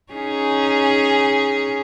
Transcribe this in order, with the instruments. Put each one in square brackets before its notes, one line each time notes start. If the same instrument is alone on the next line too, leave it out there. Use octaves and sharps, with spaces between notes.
[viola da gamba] C#4 D#4 G#4